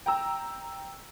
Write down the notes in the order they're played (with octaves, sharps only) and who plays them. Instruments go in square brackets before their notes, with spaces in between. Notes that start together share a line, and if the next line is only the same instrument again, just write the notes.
[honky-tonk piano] G5 A#5 E6